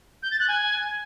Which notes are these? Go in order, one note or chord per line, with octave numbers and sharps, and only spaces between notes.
G6
A6
F#6
G#5